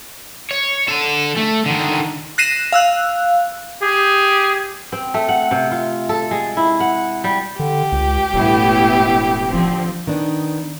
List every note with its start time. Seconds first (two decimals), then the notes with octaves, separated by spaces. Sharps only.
0.51 C#5
0.88 D3 A4
1.37 A3
1.66 D3 D#3
2.38 F#6 A#6 C7 D#7 E7
2.72 F5 E6 F#6
3.82 G4 G#4
4.92 C4
5.14 A3
5.29 F#5
5.51 C3
5.71 F4
6.09 A4
6.31 G#3
6.57 E4
6.80 F#5
7.24 G3
7.59 D3 G4
7.92 C#2
8.33 E1 A2 B3 E4
9.49 D3 F3 C4
10.07 D#3 B3 D4